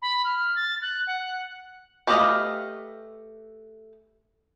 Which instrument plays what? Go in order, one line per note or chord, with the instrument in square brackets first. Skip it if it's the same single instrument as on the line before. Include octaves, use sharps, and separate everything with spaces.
[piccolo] B5
F6
A6
F#6
F#5
[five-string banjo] A3 G4 B4 D#5 F5